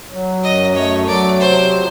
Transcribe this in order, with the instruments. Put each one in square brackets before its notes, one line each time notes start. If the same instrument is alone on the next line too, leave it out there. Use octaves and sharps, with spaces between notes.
[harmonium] F#3
[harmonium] F#2 [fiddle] D#5
[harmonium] A3 [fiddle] C#5
[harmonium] F#3 [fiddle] D5
[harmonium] C3 [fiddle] C5
[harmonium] F3